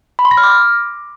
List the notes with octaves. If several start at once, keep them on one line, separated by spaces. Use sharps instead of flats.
B5
C6
A#6
F6
D6